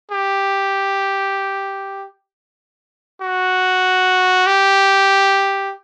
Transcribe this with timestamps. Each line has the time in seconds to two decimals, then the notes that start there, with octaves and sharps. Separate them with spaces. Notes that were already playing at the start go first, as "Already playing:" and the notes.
0.11 G4
3.22 F#4
4.46 G4